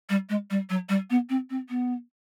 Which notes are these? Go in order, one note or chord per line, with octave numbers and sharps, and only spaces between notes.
G3
G#3
G3
F#3
G3
B3
C4
C4
B3